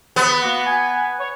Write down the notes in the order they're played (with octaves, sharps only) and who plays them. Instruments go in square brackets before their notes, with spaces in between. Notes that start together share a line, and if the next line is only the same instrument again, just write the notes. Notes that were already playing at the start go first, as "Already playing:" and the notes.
[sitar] B3
[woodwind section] A#3 F#4
G#5
C#5